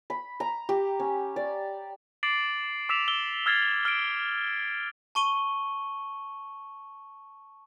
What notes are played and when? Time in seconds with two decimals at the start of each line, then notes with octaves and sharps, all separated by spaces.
0.10 B5
0.40 A#5
0.69 G4
1.00 C#4
1.36 D5
2.23 D6 A6 C7 D7 F#7
2.89 D6 E6 B6 E7 F7
3.08 E6 G7
3.46 E6 F6 G#6 A6 C7
3.85 F6 D7
5.15 A5 C#6 D#7 G7